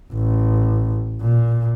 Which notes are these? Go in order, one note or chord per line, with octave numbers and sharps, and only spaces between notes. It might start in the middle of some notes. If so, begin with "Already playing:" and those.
A1
A#2